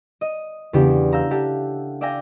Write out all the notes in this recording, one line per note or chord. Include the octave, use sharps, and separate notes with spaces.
D#5
E2 C#3 B3 D4 G4 D7
F5 A#5 E6 G6
G4 A4 E5 F#5 A5
D5 E5 F5 G5 G#5 A#6